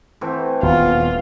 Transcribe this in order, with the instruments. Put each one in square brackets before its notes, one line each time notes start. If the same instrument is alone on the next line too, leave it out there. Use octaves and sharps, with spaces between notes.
[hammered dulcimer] E3 A3 C4
[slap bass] D#1 B3 [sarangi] F4